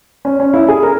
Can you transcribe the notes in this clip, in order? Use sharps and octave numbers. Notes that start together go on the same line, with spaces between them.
C#4
C#4
E4
G#4
A#4